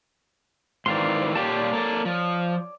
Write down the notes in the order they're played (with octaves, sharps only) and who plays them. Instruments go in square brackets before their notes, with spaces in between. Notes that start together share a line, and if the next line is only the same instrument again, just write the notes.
[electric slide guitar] G#2 D#3 E3 [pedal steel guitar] D5 F5 C6
[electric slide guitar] A#2 F4 G4 [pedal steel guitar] C#5 D5 A5
[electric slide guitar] A#3 A4
F3